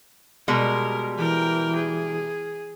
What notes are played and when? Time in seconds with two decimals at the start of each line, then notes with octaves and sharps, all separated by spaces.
0.48 B2 G3 G#3 A#4
1.18 E3 A#4 G5
1.76 G#4